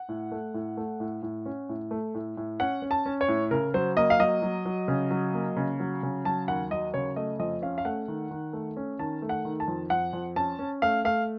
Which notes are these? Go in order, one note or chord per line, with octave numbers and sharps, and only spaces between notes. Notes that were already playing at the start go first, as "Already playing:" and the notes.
Already playing: F#5
A2
A3
A2
A3
A2
A2
C#4
A2
A3
A2
A2
C#4 F#5
C#4
A5
C#4
C#5
A2
C#3 A#4
F#3 C5
A#3 D#5
F5
F#3 D#5
F#3
F#3
C#3
F#3
A#3
C#3
F#3
C#3
F#3 A5
D#2 F#5
F#3 D#5
C#3 C#5
A3 D#5
F2 D#5
C#4 F5
F5
A3 F#5
D#3
D#3
A3
C#4
D#3 A5
A3
F#5
D#3
A5
F2
F2 F#5
F2
C#4 A5
C#4
A3 F5
A3 F5